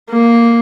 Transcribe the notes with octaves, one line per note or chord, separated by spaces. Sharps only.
A#3